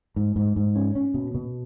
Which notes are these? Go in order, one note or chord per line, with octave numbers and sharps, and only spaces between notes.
G#2
G#2
G#2
C#4
C#4
B2
B2